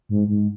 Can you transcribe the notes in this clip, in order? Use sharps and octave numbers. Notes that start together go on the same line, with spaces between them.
G#2
G#2